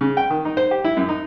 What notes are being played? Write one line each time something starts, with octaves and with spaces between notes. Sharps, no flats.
C#3
G5
D#3
D#4
C5
G4
E4
F#2
D#4